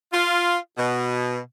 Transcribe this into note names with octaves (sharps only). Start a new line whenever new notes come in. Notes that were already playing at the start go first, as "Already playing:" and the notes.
F4
B2